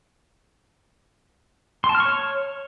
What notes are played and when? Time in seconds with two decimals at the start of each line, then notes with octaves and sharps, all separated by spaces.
1.84 C6
1.89 A5
1.95 F6
2.00 C#6
2.05 C#5